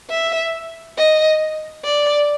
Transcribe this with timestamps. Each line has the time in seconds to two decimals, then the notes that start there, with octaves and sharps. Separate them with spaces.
0.10 E5
0.98 D#5
1.84 D5